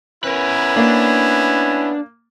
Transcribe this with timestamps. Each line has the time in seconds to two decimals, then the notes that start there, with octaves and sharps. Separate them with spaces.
0.24 B3 C#4 E4 A#4 B4
0.76 A#3 D4